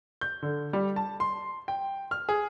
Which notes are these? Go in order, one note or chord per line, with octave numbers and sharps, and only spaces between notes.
G6
D3
G3
A5
C6
G5
F6
G#4